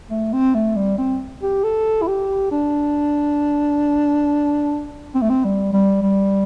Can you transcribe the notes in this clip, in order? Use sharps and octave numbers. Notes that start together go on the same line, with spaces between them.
A3
C4
A3
G3
C4
G4
A4
E4
G4
D4
C4
A3
C4
G3
G3
G3